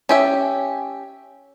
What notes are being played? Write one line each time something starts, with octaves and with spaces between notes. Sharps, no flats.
C#4 G4 E5